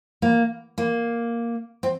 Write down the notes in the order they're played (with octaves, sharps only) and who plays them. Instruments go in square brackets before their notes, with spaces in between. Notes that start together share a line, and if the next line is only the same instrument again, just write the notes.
[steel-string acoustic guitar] A#3
A#3
C4